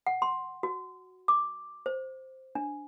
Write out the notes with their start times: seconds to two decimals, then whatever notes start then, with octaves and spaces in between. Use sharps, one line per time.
0.07 F#5
0.22 C6
0.63 F#4
1.28 D6
1.86 C5
2.55 D4